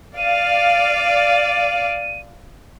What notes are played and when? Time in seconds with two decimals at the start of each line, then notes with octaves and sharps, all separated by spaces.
0.17 D5 F5 D#7